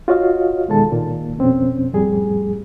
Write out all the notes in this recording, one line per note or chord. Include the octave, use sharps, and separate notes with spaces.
F4 F#4 C#5 D#5 F5
E2 B2 D#3 G#3 A4 A5
A#2 D#3 A#3
F2 B2 C4 C#4
F2 A2 G3 G#4